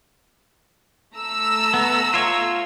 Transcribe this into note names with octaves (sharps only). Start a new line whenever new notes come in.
A3 A#5 E6
B3
F4 C#5